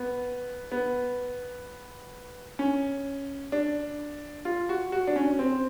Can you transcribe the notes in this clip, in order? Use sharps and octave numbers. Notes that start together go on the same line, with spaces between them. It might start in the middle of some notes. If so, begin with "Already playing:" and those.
Already playing: B3
B3
C#4
D4
F4
F#4
F#4
D4
C#4
C4